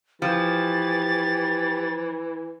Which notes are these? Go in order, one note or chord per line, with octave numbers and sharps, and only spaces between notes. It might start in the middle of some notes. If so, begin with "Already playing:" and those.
E3 F3 G4 A6